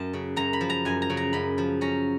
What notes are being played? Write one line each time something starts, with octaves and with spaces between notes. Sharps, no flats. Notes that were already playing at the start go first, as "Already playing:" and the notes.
Already playing: F#2 A5
C#3
F#2 A#5
B5
F3
A#5
F#2 G#5
A#5
C#3
A#5
F#2 B5
F3
C#4 A#5